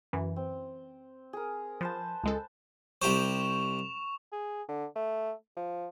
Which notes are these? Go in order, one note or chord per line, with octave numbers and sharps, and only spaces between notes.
F#2 E3
C4
G#4 A#4
F3 B4 C5 A5
C#2 G#3 A4
C2 G4 C5 C#6 E7 F7
G#4
D3
A3
F3